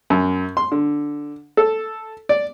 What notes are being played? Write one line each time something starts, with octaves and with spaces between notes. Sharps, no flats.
F#2
C6
D3
A4
D5